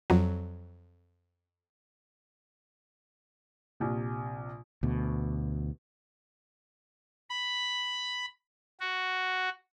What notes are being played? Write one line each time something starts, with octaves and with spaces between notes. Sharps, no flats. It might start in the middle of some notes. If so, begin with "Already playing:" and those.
F2 F#3
A#1 C3
D2 B2
B5
F#4